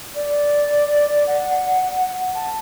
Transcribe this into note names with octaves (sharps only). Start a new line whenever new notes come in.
D5
F#5
A5